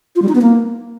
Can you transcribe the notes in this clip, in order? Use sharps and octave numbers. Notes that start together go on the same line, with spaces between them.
F4
G3
D#4
B3
A#3